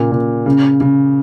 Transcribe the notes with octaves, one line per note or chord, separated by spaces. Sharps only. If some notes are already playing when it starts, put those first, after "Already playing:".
Already playing: A#2 C#3
A#2
C#3
C#3